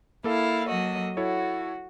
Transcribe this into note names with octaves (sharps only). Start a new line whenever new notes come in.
A#3 E4 A4 F5
F#3 F#4 D#5
E4 F#4 A4 C#5